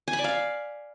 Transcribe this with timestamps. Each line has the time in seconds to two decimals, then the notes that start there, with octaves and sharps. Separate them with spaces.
0.08 G#5
0.13 B5
0.19 D5
0.24 F5